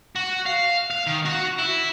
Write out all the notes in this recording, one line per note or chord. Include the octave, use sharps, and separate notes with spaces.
F#4
F5
F5
D#3
F#4
E4